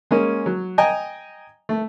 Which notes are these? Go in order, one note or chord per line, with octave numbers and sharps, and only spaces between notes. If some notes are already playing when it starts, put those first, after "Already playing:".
G#3 A#3 C#4
F#3
D#5 G5 G#5 A#5
A3